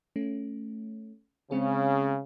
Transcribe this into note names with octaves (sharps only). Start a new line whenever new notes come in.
A3 C#4
C#3 G#3 C4 G#4